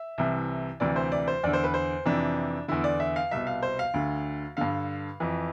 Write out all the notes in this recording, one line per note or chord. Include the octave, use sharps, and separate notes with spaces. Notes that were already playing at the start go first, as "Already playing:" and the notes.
Already playing: E5
C2 C3 E3
D2 C3 E3 D5
C5
D5
C5
E2 D3 D5
C5
B4
C5
F2 C3 E3 D4
E2 D3 E4
D5
E5
F5
C2 B2 E5
F5
C5
F5
D2 D3
G2 D3 F5
F2 E3